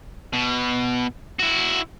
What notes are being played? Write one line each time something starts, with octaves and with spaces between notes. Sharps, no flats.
B2
E4 F#4